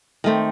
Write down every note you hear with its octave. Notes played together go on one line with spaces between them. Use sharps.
D#3 A3 C4